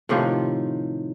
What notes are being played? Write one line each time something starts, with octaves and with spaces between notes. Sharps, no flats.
A2 C3 D#3 F3